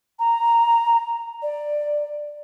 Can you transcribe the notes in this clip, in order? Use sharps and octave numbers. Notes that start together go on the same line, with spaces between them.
A#5
D5